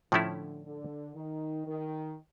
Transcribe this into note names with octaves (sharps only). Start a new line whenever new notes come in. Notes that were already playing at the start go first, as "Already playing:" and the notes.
A2 D3 F3 A3 C#4 E4
D3
D#3
D#3